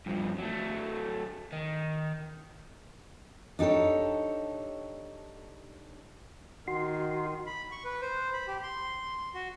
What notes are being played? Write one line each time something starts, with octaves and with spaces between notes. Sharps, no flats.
G2 F3
F#3 A3
D#3
D4 D#4 G4 A4 C#5
D#3 F#4 C6
B5
C#6
B4
C5
B5
G4
C6
F#4